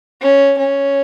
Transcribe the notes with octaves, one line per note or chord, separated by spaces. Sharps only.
C#4
C#4